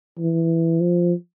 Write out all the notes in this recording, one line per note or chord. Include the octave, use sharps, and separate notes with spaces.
E3
F3